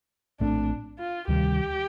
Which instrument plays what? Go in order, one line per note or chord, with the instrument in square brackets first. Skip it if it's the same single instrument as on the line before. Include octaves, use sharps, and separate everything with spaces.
[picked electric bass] A#1 A2 A3 C4 [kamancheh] D4
[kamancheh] F4
[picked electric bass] D2 C3 D#3 G3 [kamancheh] G4